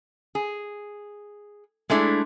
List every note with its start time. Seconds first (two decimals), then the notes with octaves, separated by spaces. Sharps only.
0.35 G#4
1.90 G#3 A3 D4 E4